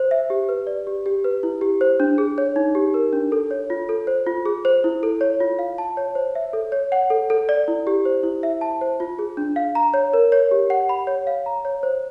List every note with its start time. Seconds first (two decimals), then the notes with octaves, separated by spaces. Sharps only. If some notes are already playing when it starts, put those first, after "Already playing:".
Already playing: C5
0.11 E5
0.30 G4
0.49 B4
0.67 D5
0.87 G4
1.06 G4
1.24 B4
1.43 E4
1.61 G4
1.81 C5
2.00 D4
2.18 G#4
2.38 C#5
2.56 D#4
2.75 G4
2.94 A#4
3.13 D4
3.32 A4
3.51 C#5
3.70 F4
3.89 A4
4.07 C5
4.26 F4
4.46 G#4
4.65 C5
4.84 E4
5.03 A4
5.21 C#5
5.40 F4
5.59 F5
5.78 A5
5.97 C#5
6.15 C5
6.35 E5
6.53 A4
6.72 C#5
6.92 F#5
7.10 A4
7.30 A4
7.49 D5
7.68 E4
7.87 G4
8.05 C5
8.23 E4
8.43 E5
8.61 A5
8.81 C5
9.00 F4
9.19 G#4
9.37 D4
9.56 F5
9.75 A#5
9.94 C#5
10.13 A#4
10.32 C#5
10.51 G4
10.70 F#5
10.89 B5
11.07 C#5
11.27 F5
11.46 A#5
11.65 C#5
11.83 C5